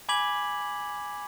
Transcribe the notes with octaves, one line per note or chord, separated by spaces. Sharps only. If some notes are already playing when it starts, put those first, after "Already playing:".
G#5 B5 D6 G#6 B6 F#7